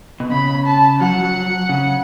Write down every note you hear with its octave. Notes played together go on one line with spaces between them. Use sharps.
B2
C#3 B5
A5
F#3 F#5
F#3
C#3